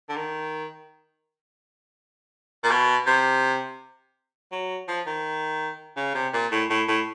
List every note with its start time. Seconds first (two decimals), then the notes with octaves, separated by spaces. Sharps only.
0.09 D3
0.16 D#3
2.64 A#2
2.71 B2
3.07 C3
4.52 F#3
4.88 F3
5.06 D#3
5.97 C#3
6.14 C3
6.33 A#2
6.52 A2
6.70 A2
6.88 A2